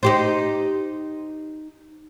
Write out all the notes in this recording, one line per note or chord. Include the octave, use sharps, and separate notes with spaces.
D#4 G4 C5